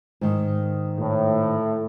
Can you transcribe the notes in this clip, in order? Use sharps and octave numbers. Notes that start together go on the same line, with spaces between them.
G#2 D#3
A2